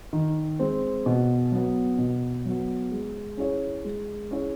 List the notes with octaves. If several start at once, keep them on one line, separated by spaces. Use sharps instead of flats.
D#3
G#3 C4
B2
F#3 B3
B2
F#3 B3
G#3
C#4 E4 G#4 C#5
G#3
C#4 E4 G#4 C#5